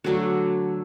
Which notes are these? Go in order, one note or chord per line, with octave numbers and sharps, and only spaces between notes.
D3 F#3 A3 D4 F#4